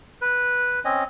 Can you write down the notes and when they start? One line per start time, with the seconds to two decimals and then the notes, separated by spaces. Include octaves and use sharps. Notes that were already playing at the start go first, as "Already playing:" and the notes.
0.21 B4
0.85 C4 C#4 D#5